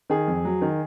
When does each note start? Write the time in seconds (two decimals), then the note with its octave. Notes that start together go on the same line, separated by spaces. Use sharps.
0.10 D#3 G#4
0.28 F2
0.45 F#3
0.62 D#3